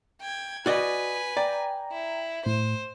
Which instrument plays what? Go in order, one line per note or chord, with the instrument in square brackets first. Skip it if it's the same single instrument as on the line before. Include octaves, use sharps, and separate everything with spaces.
[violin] G5 G#6
[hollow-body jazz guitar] F#4 D5 D#5 [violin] B4 G#5
[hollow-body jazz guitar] D5 [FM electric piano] G5 A#5
[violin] E4
[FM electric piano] A2 [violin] C5